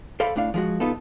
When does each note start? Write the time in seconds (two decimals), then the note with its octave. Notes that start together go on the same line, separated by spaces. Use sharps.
0.20 A4 C5 D5 F5 B5
0.36 A2 D4 F5
0.54 F3 G#3 F#4
0.80 C2 B3 D#4 F4 A4